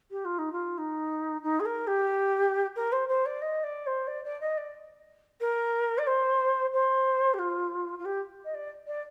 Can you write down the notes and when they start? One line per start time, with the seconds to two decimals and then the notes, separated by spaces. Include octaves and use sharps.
0.10 G4
0.24 F4
0.38 D#4
0.52 F4
0.77 D#4
1.43 D#4
1.59 G#4
1.65 A#4
1.87 G4
2.75 A#4
2.92 C5
3.08 C5
3.25 D5
3.41 D#5
3.63 D5
3.86 C5
4.07 D5
4.24 D5
4.40 D#5
4.57 D5
5.40 A#4
5.98 D5
6.06 C5
6.72 C5
7.33 G4
7.38 F4
7.98 F4
8.05 G4
8.44 D#5
8.54 D5
8.87 D5